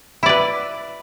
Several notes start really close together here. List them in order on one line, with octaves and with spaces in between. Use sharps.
E4 D5 B4